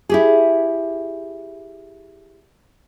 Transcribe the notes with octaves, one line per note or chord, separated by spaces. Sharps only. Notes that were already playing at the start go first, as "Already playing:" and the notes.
E4 G4 G#4